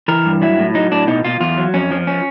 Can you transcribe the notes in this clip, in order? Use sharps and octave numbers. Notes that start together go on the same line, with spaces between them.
E3 A#4
G2
F#3 E4
A2
F#3 D#4
A2 D4
B2 D#4
B2 F4
E2 F4
F#3
F2 C#4
F3
C#4